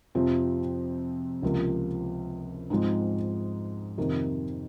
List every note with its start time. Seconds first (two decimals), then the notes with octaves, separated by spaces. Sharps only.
0.15 F2 C3 F3 C4
1.43 C#2 C3 F3 A#3
2.70 G#2 F3 G#3 C4 D#4
3.98 F2 C3 D#3 A#3